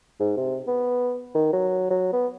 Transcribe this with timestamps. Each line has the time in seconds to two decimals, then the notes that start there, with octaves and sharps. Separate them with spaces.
0.20 G#2
0.37 C3
0.67 B3
1.35 D#3
1.53 F#3
1.90 F#3
2.13 B3